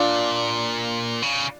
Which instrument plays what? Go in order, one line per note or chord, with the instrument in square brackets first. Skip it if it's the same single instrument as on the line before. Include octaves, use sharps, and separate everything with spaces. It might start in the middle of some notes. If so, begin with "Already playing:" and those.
Already playing: [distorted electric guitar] A#2 [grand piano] D4 F4
[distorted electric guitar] C#3